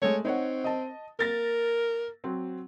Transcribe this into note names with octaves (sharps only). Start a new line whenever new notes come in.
G#3 A3 C#5
C4 D#4 C#5 F#5
D#5 A5
A#3 A#4 A6 A#6
F#3 C4